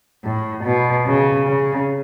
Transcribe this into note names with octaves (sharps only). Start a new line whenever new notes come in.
A2
B2
C#3
C#3